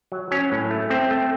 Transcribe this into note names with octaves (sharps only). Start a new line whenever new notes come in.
F#3
F#3 C#4
A2
A3
A3 C4
A3